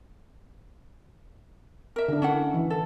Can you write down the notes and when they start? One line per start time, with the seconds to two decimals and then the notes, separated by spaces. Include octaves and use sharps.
1.96 A#4 E5
2.08 D3 D4
2.22 C#4 E4 F#5
2.54 E3
2.70 A4